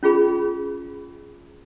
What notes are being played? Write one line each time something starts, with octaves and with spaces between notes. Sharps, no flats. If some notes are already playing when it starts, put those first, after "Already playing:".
C#4 F4 G#4 B5